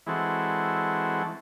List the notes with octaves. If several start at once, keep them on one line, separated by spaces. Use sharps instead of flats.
E3 G#3 C4 F#4 A4